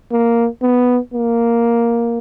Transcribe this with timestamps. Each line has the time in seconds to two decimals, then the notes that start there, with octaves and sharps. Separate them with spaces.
0.11 A#3
0.62 B3
1.14 A#3